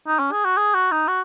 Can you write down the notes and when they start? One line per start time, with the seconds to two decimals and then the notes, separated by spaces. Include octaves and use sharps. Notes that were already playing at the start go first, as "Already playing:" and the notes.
0.07 D#4
0.19 C#4
0.32 G#4
0.45 F#4
0.57 G#4
0.74 F#4
0.91 D#4
1.08 F#4